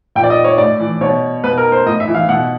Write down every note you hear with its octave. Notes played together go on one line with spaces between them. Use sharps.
A#2 G5
D5
D#5
C#5
A2 D5
E3
B2 C#5
B2 B4
A#4
C5
A2 D#5
E5
E3
F5
B2 F#5